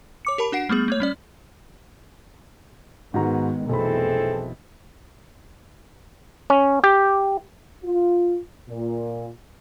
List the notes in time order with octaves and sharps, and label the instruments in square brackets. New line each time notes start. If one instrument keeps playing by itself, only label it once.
[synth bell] C#5 D6 C#7
G4 A#4 A5 B5
D4 F#4 F#5 C7 D7
G3 A3 B3 G#4
A3 A#3 C#5
G3 C#4 D5
[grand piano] G#2 F#4 A#5 [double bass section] D#3 G#3 B3
[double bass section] F1 E3 [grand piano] B1 B5 [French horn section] C4 G#4 A4
[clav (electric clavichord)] C#4
G4
[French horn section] F4
A#2